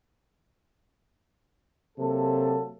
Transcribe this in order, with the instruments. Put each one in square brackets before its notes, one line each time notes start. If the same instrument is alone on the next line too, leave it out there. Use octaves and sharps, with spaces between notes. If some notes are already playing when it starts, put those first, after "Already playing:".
[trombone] C3 [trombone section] F#3 A#3 A4